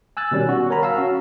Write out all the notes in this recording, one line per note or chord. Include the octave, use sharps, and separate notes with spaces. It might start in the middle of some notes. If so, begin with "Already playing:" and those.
G#5 E6 F#6 A6
B2 D#3 G3 C#4
F#4
A#4 C#5 G#5 A#5 B5
F5 A5 E6
C#4 F#4